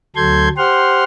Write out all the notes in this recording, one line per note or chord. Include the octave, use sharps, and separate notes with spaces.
D2 F#3 A4 C6 G6 G#6
G4 C5 F#5 C6 F6